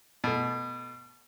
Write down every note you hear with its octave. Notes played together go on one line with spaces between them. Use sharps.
B2 A3